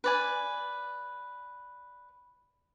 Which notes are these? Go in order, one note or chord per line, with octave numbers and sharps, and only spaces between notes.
B4 D5 G#5